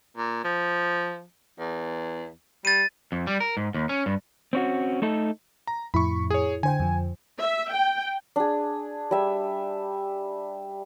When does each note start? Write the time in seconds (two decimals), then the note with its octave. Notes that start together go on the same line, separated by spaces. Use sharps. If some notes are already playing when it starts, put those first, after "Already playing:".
0.17 A#2
0.44 F3
1.59 E2
2.65 G3 A6 D#7
3.12 F2
3.27 G3
3.40 A#4
3.57 G#2
3.74 D#2
3.89 C#4
4.06 G2
4.53 C4 C#4 F#4
5.02 A3 D#4 A4
5.67 A#5
5.94 F2 A2 E4 B5 C#6
6.30 G#4 C#5
6.63 D3 C5 G5 G#5
6.80 F2 F3
7.39 E5
7.72 G5
8.36 D4 G#4
9.11 G3 E5